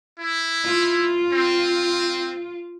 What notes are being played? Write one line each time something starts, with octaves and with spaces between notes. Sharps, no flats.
E4
F4
C4